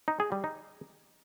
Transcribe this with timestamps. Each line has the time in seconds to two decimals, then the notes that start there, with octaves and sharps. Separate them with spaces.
0.08 D#4
0.20 G#4
0.32 G3
0.44 D#4